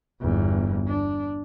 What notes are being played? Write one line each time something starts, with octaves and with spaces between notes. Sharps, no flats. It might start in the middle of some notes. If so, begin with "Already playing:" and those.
G1 E2
D4